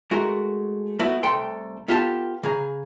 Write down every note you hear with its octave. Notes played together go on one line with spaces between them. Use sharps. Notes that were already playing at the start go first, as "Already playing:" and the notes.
G#3 A3 F#4 A#4
A3 B3 E4 F#4
C2 A3 A4 G5 C6
B3 F4 G4 A4 D#5 A5
C#3 G#4 A#5